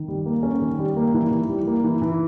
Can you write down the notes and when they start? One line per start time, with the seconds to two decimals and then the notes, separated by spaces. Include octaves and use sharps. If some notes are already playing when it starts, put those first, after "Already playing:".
Already playing: D#3
0.08 G3
0.26 A#3
0.43 C#4
0.61 D#3
0.79 G3
0.97 A#3
1.14 E3
1.31 E3
1.49 G3
1.67 A#3
1.84 E3
2.02 E3